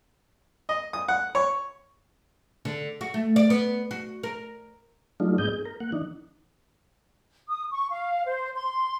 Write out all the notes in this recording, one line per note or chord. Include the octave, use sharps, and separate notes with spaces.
D#5
D#6
F#5
C#5
D3
F#4
A3
D5
B3
F#4
A#4
F#3 G3 A3 D4 D#4 F4
G#2 B3 D4 G#4 D#5 G6
G#4
A#4
A#3 F#5
E3 D4 D#4
D#6
C#6
F5
C5
C6